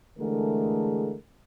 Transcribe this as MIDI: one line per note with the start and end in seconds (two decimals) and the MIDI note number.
0.19 1.15 50
0.19 1.15 52
0.19 1.15 56
0.19 1.15 57
0.19 1.15 68
0.19 1.15 70